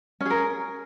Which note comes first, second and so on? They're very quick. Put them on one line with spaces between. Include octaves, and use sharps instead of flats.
C#4 G#4 A#4